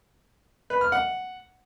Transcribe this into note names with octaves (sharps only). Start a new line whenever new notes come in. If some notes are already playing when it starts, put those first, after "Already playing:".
B4
F6
F#5